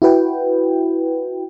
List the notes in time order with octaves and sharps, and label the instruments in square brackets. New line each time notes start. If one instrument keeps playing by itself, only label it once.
[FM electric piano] E4 F#4 B4 G5